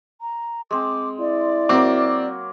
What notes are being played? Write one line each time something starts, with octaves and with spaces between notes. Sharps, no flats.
A#5
G#3 C4 D6
E4 D5
F#3 A#3 C4 D6